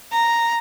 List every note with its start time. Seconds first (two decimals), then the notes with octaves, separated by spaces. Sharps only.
0.11 A#5